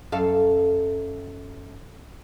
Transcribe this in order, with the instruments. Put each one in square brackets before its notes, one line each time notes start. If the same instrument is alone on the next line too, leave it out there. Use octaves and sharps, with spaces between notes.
[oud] F#2 A4 F5